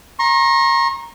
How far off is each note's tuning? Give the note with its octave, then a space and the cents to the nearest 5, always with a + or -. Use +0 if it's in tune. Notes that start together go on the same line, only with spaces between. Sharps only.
A#5 +10 C#6 -45